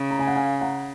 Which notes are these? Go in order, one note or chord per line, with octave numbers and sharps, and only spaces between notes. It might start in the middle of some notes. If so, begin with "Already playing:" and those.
Already playing: C#3
A#5
G#5
F#5
F5 G#5
F#5 A#5